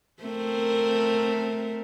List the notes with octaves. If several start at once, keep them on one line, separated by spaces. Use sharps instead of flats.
A3 C4 A#4